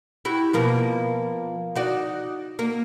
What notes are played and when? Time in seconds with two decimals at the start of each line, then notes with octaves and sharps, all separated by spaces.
0.25 E4 F#4 G4
0.53 B2 F3 A#3
1.76 D#4 F#4 D5
2.59 A#3